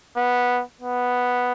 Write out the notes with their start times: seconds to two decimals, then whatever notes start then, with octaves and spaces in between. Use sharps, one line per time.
0.17 B3
0.80 B3